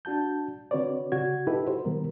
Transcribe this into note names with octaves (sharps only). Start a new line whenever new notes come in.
D4 F#4 A5 G6
D3 C4 F#4 B4 C#5 D5
C#3 F#4 G#6
D#4 E4 G4 A4 B4 E5
F#4 C5
B2 D#3 G3 B3 A#4